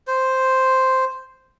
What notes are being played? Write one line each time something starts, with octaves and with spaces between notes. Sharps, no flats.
C5